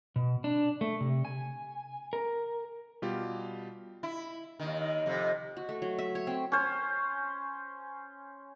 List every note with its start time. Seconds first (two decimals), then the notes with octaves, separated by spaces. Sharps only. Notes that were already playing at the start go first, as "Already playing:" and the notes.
0.16 B2
0.44 D4
0.81 A3
1.01 C3
1.25 G#5
2.13 A#4
3.02 B2 G3 F4 G4
4.03 E4
4.60 D#2 D#3
5.06 F2 C3
5.57 F#4
5.69 A3
5.82 F#3
5.99 E5
6.15 C#5
6.27 C4
6.52 C#4 C5